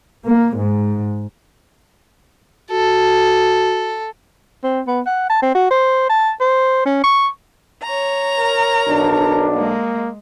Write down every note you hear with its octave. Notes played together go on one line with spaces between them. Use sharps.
A#3
G#2
F#4 A4
C4
B3
F#5
A5
C4
F#4
C5
A5
C5
C#4
C#6
C#5 A#5
A#4
B1 D4
G#3 A#3